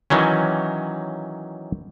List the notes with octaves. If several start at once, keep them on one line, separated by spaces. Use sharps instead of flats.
D#3 E3 F#3 C#4